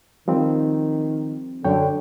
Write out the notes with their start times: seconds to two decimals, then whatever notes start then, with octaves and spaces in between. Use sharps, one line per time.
0.28 D#3 F3 G3 C4
1.65 F#2 D3 C#5 G5